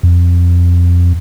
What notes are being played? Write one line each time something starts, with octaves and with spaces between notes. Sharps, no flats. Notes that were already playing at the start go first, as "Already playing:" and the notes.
F2